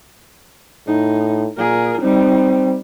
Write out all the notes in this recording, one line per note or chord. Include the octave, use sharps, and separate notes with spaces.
A2 D#4
A#2 G#4 A#4
G3 C4 D#4